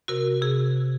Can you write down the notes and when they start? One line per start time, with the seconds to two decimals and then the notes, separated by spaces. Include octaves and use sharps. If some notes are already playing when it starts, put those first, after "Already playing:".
0.08 C3 F#4 A#4
0.42 C3 G#4